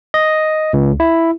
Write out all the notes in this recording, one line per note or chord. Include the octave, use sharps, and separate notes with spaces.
D#5
C#2
E4